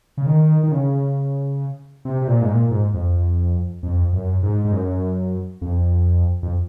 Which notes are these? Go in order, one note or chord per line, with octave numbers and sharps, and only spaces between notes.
C#3
D#3
D#3
C#3
C3
C3
A#2
G#2
A#2
G#2
F2
F2
F#2
G#2
G#2
F#2
F2
F2